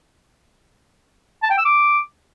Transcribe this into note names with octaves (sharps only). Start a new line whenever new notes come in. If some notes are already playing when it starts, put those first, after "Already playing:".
A5
G5
E6
D6